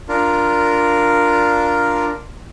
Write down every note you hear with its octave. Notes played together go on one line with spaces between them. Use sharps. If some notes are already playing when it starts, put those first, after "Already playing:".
D4 F4 A#4